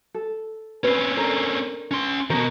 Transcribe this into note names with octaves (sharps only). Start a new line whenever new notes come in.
A4
C4 C#4 B4
D4 A4 A#4
C#4 C6
B2 D#3 A#4